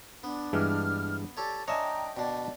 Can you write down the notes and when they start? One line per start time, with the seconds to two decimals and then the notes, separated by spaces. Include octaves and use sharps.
0.24 B3 D4
0.53 G2 E3 G#3 F6
1.37 G4 A4 C#5 D5
1.68 D4 C#5 D#5 E5 G5 G#5 A#5
2.17 B2 D4 D5